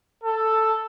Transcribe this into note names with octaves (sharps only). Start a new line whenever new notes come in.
A4